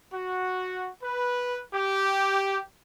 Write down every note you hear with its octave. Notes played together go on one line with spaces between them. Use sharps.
F#4
B4
G4